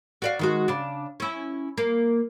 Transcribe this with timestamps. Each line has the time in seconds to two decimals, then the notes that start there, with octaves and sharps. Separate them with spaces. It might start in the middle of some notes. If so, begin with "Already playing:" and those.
0.22 F#4 D5 F5
0.39 D#3 G#3 F#4
0.68 C#3 D4
1.20 C#4 E4
1.78 A#3